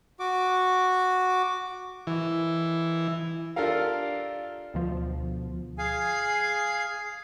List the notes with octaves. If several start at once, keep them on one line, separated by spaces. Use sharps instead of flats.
F#4 D6
E3
D4 F4 G4 A4 A#4 F5
D2 B2 F3
G#4 F5 G#5